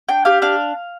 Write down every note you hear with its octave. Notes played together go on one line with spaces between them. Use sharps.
D4 G5
G4 F5
D4 F5